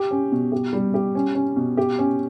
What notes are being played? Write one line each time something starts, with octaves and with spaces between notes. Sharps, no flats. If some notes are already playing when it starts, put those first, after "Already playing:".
Already playing: G4
C#4
B2
G4
G3
G4
C#4
C#4
B2
G4
C#4